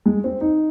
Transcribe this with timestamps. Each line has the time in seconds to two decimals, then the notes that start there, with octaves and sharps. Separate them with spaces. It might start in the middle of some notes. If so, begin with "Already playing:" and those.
0.06 G#3
0.24 C4
0.41 D#4